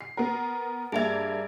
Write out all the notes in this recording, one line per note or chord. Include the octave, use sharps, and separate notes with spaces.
C7
B3 A#4
G2 A#3 G#4 E5 G#6